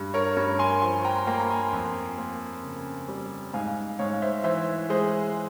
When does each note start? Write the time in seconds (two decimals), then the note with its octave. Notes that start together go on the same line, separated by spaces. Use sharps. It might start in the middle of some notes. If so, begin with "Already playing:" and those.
Already playing: G2
0.14 A#4 C#5
0.37 G2 A#4 C#5
0.59 G#5 C6
0.82 F3 G#5 C6
1.05 G5 A#5
1.27 A#3 G5 A#5
1.40 A#5
1.50 G#5 C6
1.73 F2
2.18 A#3
2.63 C#3
3.08 G3
3.53 G#2 F5 G#5
3.99 G#2 C#5 F5
4.22 C5 E5
4.44 E3 C5 E5
4.90 G#3 G#4 C5